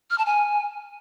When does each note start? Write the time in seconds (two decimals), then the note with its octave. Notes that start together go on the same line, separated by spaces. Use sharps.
0.10 F6
0.18 A5
0.26 G#5